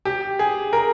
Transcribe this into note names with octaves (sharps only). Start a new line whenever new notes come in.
G4
G#4
A#4